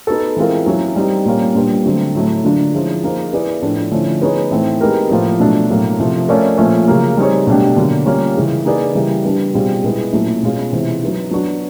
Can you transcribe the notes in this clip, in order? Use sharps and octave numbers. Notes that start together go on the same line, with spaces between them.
B3 D#4 F#4 A4
E3 G#3 C4 F4 A#4
F#3 A#3 C#4 E4
G3 C4 D#4
A#2 G3 A#3 C#4
A#2 G3 B3 D4
D3 F#3 A3 C4
A2 F#3 A3
D3 F#3 A#3 D4 F4
F3 G#3 C#4 E4
A#3 D#4 G#4 C5
B3 E4 G#4 B4 D5
A2 F3 A3 D4
D3 F3 A3 C#4 E4
B3 D#4 G#4 C#5
A2 E3 A3 C4 D#4
G#3 B3 D#4 G4 A#4
A2 F3 A#3
B2 F#3 A3 D4
A2 F#3 A#3
C3 F3 A3
A3 C#4 F4 A#4 D5
A#2 F3 A3 C#4
C#3 F#3 A#3
G3 C4 D#4 G#4 C#5
B2 F#3 A3 D4 G4
D3 F#3 A#3
G3 A#3 C#4 F4
C#3 E3 G#3
A#3 D#4 G#4 B4 D5
C#3 E3 G3 A#3
G3 B3 D4 G4
B2 G3 C4 F4 G#4
B2 G#3 B3 E4
A#2 F#3 A3 C#4 E4
B2 G#3 C#4 F4
C3 E3 G#3
F#3 B3 D#4
F#3 B3 D4 F#4